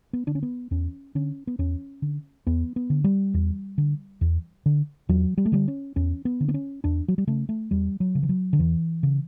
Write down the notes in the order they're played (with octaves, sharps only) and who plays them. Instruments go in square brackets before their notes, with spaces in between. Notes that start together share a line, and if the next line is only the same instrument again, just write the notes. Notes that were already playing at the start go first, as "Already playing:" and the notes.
[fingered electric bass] B3
D3 D4
C#4
B3
E2 C#4
D3 C#4
B3
E2 C#4
D3
E2 B3
B3
D3
G3
E2
D3
E2
D3
E2 F#3
G3
A3
D3 G3
C#4
E2 C#4
B3
D3
B3
C#4
E2 D4
F#3
G3
C#3 A3
A3
E2 G3
F#3
C#3
E3
F#3
D3
E2 E3
C#3